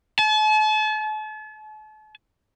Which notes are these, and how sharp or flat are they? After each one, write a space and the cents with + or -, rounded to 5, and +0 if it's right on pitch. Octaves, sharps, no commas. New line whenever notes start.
A5 -40